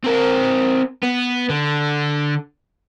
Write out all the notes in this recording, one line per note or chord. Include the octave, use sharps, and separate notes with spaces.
C4 A#4
B3
D3